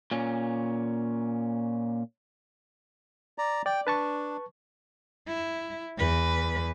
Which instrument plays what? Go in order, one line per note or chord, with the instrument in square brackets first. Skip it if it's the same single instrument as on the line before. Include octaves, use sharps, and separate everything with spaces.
[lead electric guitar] A#2 C#4
[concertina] D5 A#5
[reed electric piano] D5 [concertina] G5
[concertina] D4 [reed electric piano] B4 A5 C#6
[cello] E4
E2 B4